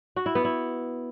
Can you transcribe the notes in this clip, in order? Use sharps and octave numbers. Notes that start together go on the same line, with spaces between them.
F#4
E4
B3
E4